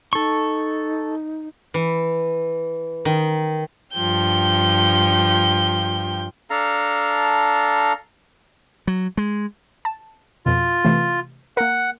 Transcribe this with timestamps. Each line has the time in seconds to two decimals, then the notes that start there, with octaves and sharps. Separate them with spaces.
0.13 D#4 A4 C#6
1.74 E3
3.05 D#3
3.93 G2 F3 G5 G6
6.50 D4 A4 F5 A#5
8.87 F#3
9.17 G#3
9.85 A5
10.46 F2 B2 F4
10.85 C3 E3 A3
11.57 A#3 A#4 F#5